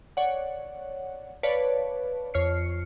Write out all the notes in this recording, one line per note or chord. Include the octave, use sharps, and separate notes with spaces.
C#5 D5 F#5
B4 C#5 D5 F5 A5
F2 C#5 F6 C7 C#7